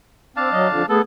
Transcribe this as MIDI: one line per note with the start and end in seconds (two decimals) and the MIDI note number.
0.37 0.49 60
0.37 0.86 62
0.37 0.86 77
0.37 0.86 81
0.52 0.67 54
0.52 0.67 75
0.69 0.83 41
0.69 0.83 50
0.69 0.83 53
0.89 0.99 57
0.89 1.02 59
0.89 0.99 68
0.89 1.02 69